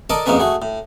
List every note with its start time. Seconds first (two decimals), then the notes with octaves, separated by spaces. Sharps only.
0.10 A4 A#4 D5 D#5 A5
0.26 F2 G#2 G#3 A#3 C#4 B4
0.40 A3 F#4 G#4
0.62 A2